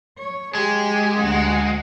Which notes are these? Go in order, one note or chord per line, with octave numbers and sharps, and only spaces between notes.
C#5
G#3 G4 G#4
D2 F#5